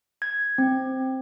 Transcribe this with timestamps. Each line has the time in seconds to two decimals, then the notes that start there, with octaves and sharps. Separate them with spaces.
0.22 G#6
0.58 C4